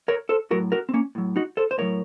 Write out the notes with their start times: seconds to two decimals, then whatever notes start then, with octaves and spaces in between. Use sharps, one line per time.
0.08 A#4 C#5
0.29 A4 C5
0.51 A2 F#3 F#4 A#4
0.72 F#4 A#4
0.89 C4
0.94 A#3 C#4
1.15 A2 F#3
1.36 D#4 F#4
1.57 A4 C5
1.71 C5
1.78 A2 F#3 A#4 C#5